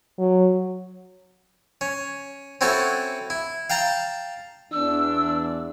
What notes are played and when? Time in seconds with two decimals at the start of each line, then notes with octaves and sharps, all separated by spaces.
0.18 F#3
1.81 C#4
2.61 C4 C#4 E4 F#4 A4
3.30 E4
3.70 F5 G5 A5 A#5
4.71 E2 D4 E6